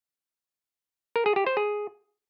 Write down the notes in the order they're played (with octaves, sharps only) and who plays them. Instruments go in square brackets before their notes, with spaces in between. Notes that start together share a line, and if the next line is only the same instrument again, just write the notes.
[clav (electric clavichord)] A#4
G#4
G4
C5
G#4